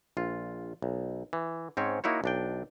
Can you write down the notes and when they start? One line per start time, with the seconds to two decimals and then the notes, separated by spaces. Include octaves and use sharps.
0.17 A#1 F4
0.82 B1
1.33 E3
1.77 G#2 C4 C#4 C#5
2.04 A#3 D#4 E4 F#4 C#5
2.24 B1 D4 G5